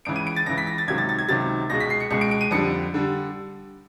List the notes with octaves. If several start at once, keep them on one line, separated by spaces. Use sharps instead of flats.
C#2 C#3 E3 D7
D#7
D7
A6
C#2 C#3 E3 A#6
B6
A#6
A6
C#2 C3 D#3 F#3 G#6
A6
A6
G#6
C#2 C3 D#3 F#3 A6
C#2 B2 G#3 A#6
B6
C7
C#7
C#2 B2 G#3 C#7
D7
D7
D#7
F2 D3 G3 C#7
D3 G3